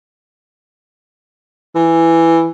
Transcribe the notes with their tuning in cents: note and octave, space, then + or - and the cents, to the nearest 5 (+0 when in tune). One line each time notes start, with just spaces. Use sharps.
E3 +5